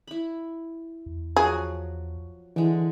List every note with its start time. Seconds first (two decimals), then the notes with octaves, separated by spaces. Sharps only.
0.07 E4 B5
1.06 E2
1.36 F3 F#3 F#4 G#4
2.56 D3 E3 G#3